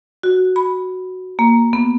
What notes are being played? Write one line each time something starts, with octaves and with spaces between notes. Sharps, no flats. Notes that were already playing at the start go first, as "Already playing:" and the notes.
F#4
B5
A#3
B3